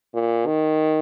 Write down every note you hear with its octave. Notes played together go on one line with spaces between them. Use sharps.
A#2
D#3